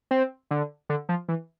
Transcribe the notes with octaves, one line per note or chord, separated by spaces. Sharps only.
C4
D3
D3
F3
E3